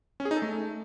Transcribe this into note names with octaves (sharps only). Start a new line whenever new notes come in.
C#4
G#4
D#4
A4
A3